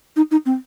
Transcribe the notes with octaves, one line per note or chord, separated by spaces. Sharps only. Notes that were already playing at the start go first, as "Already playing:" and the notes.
D#4
D#4
C4